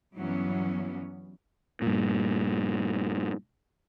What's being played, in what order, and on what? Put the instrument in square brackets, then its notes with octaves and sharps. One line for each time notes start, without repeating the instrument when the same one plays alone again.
[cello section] G2 E3 F#3 B3 C#4
[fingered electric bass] G2 A#2